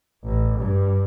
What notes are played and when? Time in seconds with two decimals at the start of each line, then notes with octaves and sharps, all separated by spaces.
0.24 A1
0.60 G2